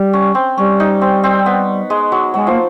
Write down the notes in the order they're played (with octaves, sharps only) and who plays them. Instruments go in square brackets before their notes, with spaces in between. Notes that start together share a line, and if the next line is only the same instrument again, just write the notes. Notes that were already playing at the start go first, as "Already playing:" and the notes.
Already playing: [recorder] G3
[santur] C#4
C4
[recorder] G3 [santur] C#4
[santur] D#4
C4
C4
B3
G#3
F#3
[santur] F#3 [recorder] G#3
[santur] F3 [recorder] A#3